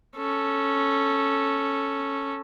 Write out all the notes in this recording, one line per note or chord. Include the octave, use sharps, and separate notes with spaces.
C#4 A4